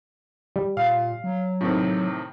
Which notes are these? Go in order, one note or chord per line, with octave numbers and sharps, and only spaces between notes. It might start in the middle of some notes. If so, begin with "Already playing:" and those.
G3
A#2 F5
F#3
A2 C3 D#3